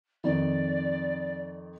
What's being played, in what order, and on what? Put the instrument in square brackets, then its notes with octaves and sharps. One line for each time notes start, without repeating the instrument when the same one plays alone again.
[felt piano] F2 D#3 [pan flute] D5